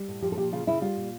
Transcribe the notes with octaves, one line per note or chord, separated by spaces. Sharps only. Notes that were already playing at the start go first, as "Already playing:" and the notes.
Already playing: G3
A2
F3 G4
A4
A#2 G4
C#3 F4
C#3 E4
G3 F4
A#2